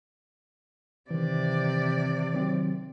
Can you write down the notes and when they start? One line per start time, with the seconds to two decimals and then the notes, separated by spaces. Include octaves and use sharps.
1.11 C3 D#3 E3 D5
2.33 D#3 F#3 C4